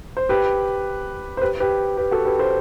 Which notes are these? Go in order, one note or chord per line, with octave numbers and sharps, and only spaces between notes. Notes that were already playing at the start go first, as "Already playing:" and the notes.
C5
G4 B4
C5
G4 B4
G4 B4
G4 B4
F#4 A4
G4 B4
A4 C5